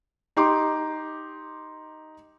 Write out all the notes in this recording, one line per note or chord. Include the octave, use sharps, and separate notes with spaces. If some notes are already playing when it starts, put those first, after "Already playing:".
D#4 G4 C6 D6